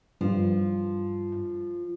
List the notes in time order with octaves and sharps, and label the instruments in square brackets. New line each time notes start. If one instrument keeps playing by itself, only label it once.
[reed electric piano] G2 [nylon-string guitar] F3